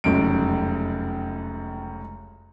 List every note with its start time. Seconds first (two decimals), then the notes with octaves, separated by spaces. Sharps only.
0.04 F1 C#2 F#2 D7